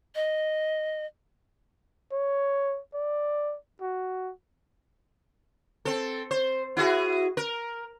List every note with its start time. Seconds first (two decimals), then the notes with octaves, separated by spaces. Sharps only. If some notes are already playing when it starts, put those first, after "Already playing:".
0.15 D#5
2.12 C#5
2.94 D5
3.81 F#4
5.85 C4 A4
6.31 C5
6.77 E4 F#4 G#4
7.37 A#4